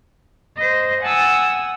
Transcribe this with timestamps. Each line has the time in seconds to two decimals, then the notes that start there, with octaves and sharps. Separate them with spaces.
0.56 C5 D#5
1.02 F#5 G#5 A5 D#6 E6